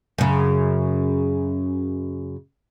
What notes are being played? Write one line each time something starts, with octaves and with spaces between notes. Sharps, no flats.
F#2 C#3